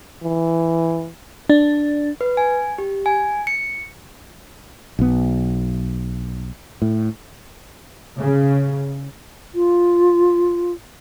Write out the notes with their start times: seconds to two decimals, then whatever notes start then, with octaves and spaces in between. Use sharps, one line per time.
0.23 E3
1.50 D4
2.21 B4
2.37 G#5
2.78 G4
3.06 G#5
3.47 C#7
4.99 B1 B3
6.82 A2
8.18 C#3
9.55 F4